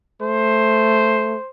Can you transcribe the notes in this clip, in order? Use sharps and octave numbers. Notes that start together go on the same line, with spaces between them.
A3 C5